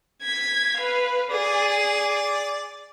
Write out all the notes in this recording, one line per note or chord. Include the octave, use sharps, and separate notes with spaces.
G#6 B6
B4 F5
G#4 D5